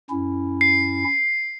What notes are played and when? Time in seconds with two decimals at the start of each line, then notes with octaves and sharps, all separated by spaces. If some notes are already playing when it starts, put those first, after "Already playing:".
0.10 F#2 C#4 E4
0.61 C7